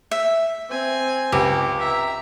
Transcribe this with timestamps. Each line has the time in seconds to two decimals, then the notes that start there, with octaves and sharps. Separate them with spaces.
0.11 E5
0.70 C4 G#5
1.32 C#2 G4
1.79 E5 A#5